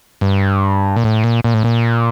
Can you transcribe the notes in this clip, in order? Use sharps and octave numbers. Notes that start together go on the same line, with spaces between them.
G2
A#2
A2
A#2
A#2
A2
A#2